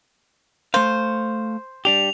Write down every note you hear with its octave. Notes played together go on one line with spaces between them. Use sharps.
A3 C5 F5
G3 D4 G4 F7